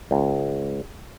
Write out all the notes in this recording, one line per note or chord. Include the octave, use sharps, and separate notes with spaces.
C#2